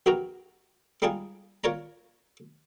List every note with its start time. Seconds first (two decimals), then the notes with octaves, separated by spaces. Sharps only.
0.06 A#1 B2 F#4 G4 A#4 A#5
1.02 G3 G#3 D4 D#4 F4 G#4
1.64 F4 A#4 C#5 D5 A#5